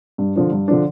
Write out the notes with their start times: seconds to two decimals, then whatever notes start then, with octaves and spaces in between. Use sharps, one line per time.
0.18 G2
0.36 D3 F3 D4
0.52 G2
0.68 D3 F3 D4